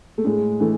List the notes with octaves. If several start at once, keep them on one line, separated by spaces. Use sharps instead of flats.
A3
A2 G#3
E3 A3